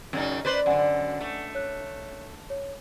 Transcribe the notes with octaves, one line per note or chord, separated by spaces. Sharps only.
F#2 C#3 D#4
B4 C5 D5
F#2 D3 D5 F#5 G#5
A3
C#5 F#6
C#5